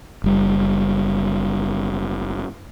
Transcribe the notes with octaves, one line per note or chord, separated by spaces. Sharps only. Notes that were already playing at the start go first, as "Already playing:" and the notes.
F#1 G3